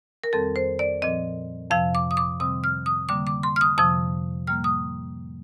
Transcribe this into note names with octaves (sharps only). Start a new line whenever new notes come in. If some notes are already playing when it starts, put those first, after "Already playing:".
A#4
F2 D#3 G3 C4 A4
C5
D5
A#2 F3 C4 D#5
F2 C3 F3 F5
D6
D#6
D6
C3 D#3 G3 C4 D#6
F6
D#6
D3 G3 A#3 D6
D6
C6
F6
D#6
F2 C3 F3 D#6
A2 G3 A#3 F6
D#6